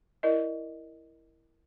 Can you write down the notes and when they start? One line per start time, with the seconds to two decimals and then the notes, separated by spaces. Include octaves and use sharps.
0.23 E4 A#4 D5 D#5